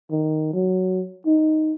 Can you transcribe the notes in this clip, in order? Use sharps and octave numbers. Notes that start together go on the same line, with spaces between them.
D#3
F#3
D#4